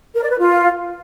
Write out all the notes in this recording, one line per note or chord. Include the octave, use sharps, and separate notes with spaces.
A#4
D5
B4
F4